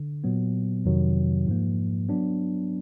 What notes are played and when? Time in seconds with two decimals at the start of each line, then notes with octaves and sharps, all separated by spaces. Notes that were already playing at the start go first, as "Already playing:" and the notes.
Already playing: D3
0.24 A#2 F#3 B3
0.85 F2 C3 D#3 F#3
1.47 G#2 F3 A#3
2.09 F#3 B3 D4